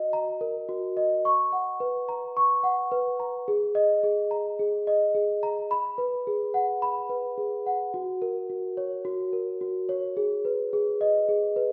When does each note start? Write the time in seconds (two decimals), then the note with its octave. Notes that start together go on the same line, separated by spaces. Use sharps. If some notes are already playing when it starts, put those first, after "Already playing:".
Already playing: F#4 D#5
0.13 A#5
0.41 A#4
0.69 F#4
0.97 D#5
1.25 C#6
1.53 F#5
1.80 B4
2.09 A#5
2.37 C#6
2.63 F#5
2.92 B4
3.20 A#5
3.48 G#4
3.75 D#5
4.03 G#4
4.31 A#5
4.59 G#4
4.87 D#5
5.15 G#4
5.43 A#5
5.71 B5
5.98 B4
6.27 G#4
6.54 F#5
6.82 B5
7.10 B4
7.38 G#4
7.66 F#5
7.94 F#4
8.22 A#4
8.50 F#4
8.77 C#5
9.05 F#4
9.33 A#4
9.61 F#4
9.89 C#5
10.17 G#4
10.45 B4
10.73 G#4
11.01 D#5
11.29 G#4
11.56 B4